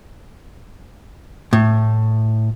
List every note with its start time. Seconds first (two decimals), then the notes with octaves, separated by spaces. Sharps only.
1.53 A2